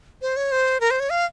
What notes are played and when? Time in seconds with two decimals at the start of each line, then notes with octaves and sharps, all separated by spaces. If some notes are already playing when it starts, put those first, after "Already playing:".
0.22 C5
0.36 C#5
0.52 C5
0.81 A#4
0.91 C5
1.00 C#5
1.10 F5